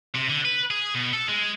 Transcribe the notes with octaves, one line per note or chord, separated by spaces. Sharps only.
C3
D3
B4
G#4
B2
A4
G#3